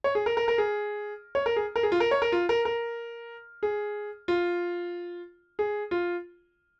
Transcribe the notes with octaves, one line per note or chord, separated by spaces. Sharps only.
C#5
G#4
A#4
A#4
A#4
G#4
C#5
A#4
G#4
A#4
G#4
F4
A#4
C#5
A#4
F4
A#4
A#4
G#4
F4
G#4
F4